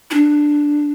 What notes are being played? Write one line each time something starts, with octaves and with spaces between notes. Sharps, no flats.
E4
D4